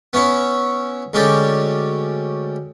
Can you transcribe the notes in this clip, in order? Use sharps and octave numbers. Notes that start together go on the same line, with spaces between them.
B3 C#4 E4 C#5
D2 G#3 C#4 G4 D5